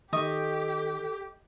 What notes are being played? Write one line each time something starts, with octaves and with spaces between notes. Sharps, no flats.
D#3 G4 A4 D#5 C#6